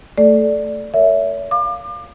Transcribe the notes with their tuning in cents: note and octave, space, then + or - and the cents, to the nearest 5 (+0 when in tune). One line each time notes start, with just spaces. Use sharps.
A3 +15 A4 -20 D5 +0
A#4 -30 C#5 +40 E5 +0
F5 +0 D6 +35